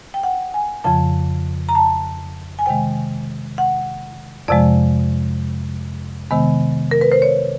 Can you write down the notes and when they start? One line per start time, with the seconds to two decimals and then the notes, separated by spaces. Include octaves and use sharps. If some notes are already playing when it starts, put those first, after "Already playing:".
0.14 G5
0.23 F#5
0.54 G#5
0.84 F2 C#3 F3 A5
1.69 A#5
1.75 A5
2.59 G#5
2.66 C3 D#3 G#3 G5
3.58 F#5
4.48 F2 C3 F3 G#3 D5
6.31 C3 D#3 G#3 B3
6.91 A#4
7.01 B4
7.12 C5
7.22 C#5